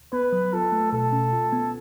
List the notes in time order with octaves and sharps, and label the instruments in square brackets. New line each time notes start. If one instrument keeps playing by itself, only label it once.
[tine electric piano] B3 [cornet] B4
[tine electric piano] F#3
[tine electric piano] F4 [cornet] A4
[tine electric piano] A3
[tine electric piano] B2 [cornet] A4
[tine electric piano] C#4
F4
B3